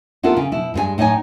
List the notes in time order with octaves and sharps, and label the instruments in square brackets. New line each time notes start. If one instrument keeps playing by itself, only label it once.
[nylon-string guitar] B3 E4 F4 A4 A#4
C#3
B2 E4
G2 G#3 G#4 G#5
A2 D#4 C#5 D#5 G#5